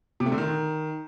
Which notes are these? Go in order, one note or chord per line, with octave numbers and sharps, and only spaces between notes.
C3
A3
D3
D#3